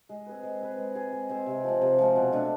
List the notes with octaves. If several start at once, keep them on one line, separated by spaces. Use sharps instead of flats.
G#3
C4 G#4 B4
G#3
C4 G#4 B4
G#3
C4 G#4
G#3
C4 G#4
C3
F3 G#3 C4
C3
F3 G#3 C4
B2
A3 D4